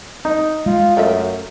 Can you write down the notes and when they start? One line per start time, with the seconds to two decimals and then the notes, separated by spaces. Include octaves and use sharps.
0.25 D#4
0.66 G#3 F4
0.97 F#2 A3 A#4 E5